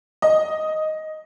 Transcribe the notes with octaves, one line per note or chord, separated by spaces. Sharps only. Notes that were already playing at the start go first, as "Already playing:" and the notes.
D#5